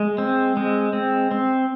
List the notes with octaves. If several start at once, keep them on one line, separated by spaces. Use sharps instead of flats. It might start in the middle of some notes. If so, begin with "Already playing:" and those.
Already playing: G#3
C4
G#3
C4
C4